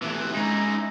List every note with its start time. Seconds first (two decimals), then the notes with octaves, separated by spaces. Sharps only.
0.02 A2 C3 E3
0.34 G#2 G#3 C#4 D#4 E4 A#5